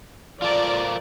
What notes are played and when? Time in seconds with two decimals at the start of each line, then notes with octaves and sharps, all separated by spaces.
0.42 F3 F4 A4 A#4 D5